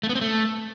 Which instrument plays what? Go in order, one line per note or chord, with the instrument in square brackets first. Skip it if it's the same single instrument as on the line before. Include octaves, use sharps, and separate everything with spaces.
[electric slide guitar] A3
B3
C4
A3